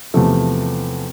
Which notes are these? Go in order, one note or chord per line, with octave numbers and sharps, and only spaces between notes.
E2 C3 F3 A3